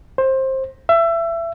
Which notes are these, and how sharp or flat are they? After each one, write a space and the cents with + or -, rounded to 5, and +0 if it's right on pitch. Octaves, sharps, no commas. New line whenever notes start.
C5 +20
E5 +25